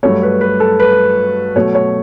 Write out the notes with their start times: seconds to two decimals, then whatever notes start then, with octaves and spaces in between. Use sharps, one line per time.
0.03 G2 F#3 A3 C#5
0.23 B4
0.41 B4
0.60 A4
0.80 B4
1.56 B2 F#3 A3 C#5
1.75 C#5